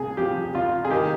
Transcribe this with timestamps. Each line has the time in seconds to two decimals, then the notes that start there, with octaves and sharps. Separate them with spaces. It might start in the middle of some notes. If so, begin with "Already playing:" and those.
Already playing: C2 G#4
0.17 F3 G4
0.55 C2 F4
0.85 G#4
0.90 D#3 G4